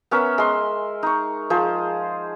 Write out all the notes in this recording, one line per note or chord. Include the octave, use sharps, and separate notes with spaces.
B3 C#4 A#4 E5
G#3 C6
D#4 C#6
F3 G#4 C5